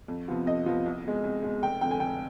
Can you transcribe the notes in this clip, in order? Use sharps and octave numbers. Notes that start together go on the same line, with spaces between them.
F2
C3 F3 B3 F4
F2 D#5
C3 F3 B3 F4
C2
B2 G#3
C2
B2 G#3
F1 G5
F2 D3 G5
G#5
F1 G5